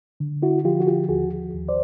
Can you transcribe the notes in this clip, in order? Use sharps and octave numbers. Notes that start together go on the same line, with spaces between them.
D3
E4 F#4
F3 F4 G4
F#4
F4 G4
D#2 F#4 G#4
D#2
C5 D5